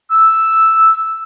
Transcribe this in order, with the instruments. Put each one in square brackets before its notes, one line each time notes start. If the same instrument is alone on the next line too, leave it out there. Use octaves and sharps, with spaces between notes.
[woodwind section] E6